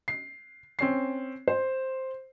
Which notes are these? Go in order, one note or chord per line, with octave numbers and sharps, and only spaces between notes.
C7
C4 C#4 C7
C5